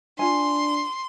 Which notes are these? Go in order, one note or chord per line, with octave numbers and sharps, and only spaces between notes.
D4 F4 G#5 C6